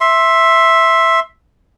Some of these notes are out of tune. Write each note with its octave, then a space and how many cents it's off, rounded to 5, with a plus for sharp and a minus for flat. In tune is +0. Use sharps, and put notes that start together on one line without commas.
E5 +0 C6 +15